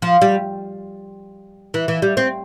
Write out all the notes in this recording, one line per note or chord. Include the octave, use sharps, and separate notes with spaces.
F3
G3
E3
E3
G3
C4